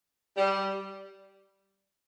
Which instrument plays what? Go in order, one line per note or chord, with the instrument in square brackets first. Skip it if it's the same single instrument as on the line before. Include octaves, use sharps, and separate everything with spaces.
[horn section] G3